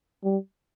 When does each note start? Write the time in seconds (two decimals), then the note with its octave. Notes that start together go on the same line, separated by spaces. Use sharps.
0.24 G3